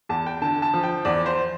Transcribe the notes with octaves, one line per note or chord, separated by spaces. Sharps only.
E2 A5
G5
D3 A5
A5
F3
G5
E2 D5
C5